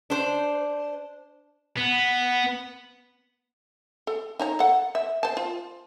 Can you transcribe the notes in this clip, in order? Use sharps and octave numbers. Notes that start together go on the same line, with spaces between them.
D4 C5
B3
A4
D#4 C#5 A#5
A4 F#5
E5
C5 A5
F4